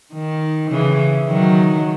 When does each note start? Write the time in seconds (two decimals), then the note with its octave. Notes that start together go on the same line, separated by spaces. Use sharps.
0.13 D#3
0.71 C#3 E3
1.28 D#3 F#3